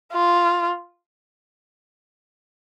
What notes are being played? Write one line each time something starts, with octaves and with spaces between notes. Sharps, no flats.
F4